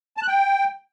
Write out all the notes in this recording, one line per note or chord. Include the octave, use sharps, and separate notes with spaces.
A5
F#6
G5